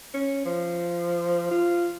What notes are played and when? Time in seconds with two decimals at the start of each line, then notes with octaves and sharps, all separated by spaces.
0.14 C#4
0.45 F3
1.51 F4